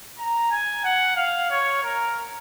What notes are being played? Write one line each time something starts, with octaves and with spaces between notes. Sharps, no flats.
A#5
G#5
F#5
F5
C#5
A#4